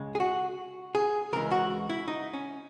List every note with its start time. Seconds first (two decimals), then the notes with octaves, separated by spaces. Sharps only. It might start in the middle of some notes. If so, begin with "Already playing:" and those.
Already playing: C#2 C#3 G#3
0.15 G#4
0.20 F#4
0.95 G#4
1.33 C#2 C#3 E3 G#3 A#4
1.51 F#4
1.90 E4
2.08 D#4
2.33 C#4